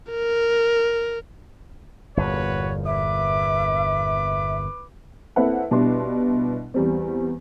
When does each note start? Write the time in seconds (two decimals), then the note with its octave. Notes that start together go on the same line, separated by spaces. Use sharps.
0.11 A#4
2.17 G1 E2 A#2 F#4 B4 C#5
2.86 B4 E5 D6
5.36 A#3 C4 E4 A4 B4 F#5
5.71 B2 G3 D4 E4 C6
6.74 E2 G3 C4